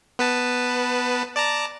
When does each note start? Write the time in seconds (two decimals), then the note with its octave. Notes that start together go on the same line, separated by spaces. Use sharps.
0.19 B3 B4 A5
1.36 D5 A5 A#5